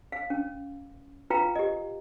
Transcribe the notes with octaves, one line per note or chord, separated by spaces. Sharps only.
F5
C#4
E4 F4 B4 F5 G5 A#5
G4 D#5